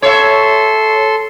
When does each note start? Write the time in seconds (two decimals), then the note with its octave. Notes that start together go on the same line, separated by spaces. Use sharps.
0.02 A4 C#5 E5 C6